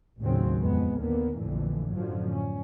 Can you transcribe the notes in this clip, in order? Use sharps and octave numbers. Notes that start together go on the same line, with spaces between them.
A1 D#2 C#3 F#3 C4
F2 G#3 B3
D#2 D3 A#3 B3
A#1 F2 A2 D3 E3
F#2 A2 D3 F3 F#3
C#4